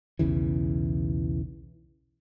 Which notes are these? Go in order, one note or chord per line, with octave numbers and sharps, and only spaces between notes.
B1 E2 C#3 E3